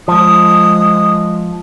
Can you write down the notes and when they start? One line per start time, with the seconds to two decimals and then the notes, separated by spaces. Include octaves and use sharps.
0.08 F3 G#3 D#6